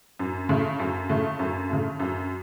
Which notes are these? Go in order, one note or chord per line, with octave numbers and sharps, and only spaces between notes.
F#2
C#3 A3
F#2
C#3 A3
F#2
C#3 A3
F#2